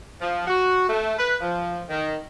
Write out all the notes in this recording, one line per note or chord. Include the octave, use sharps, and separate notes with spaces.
F3
F#4
A3
B4
F3
D#3